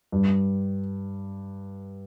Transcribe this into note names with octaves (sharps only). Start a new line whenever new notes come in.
G2